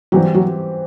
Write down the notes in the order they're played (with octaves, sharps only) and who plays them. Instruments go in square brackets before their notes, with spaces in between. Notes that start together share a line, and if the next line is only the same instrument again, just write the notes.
[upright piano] E3 G3 C4 G4 [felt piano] F#3
[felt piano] F#3